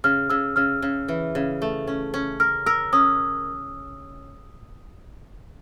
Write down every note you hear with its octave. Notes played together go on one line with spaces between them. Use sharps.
C#3 F6
C#3 E6
C#3 F6
C#3
E3
C#3
A3
C#4
C#4
A#4 F6
A#4 E6
C#4 D#6